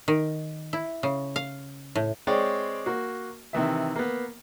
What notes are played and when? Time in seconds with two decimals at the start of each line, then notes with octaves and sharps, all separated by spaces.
0.08 D#3
0.73 E4
1.03 C#3
1.36 F5
1.95 A2
2.27 G#3 C4 C#5 D5 G5
2.86 A#3 F#4
3.53 C3 D#3 E3 E5
3.96 A#3 B3